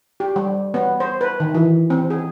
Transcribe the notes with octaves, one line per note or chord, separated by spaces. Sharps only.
G4
G3
B3
C5
B4
D#3
E3
C4
G#4